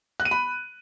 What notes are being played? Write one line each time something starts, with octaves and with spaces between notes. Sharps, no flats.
F#6
D#7
B5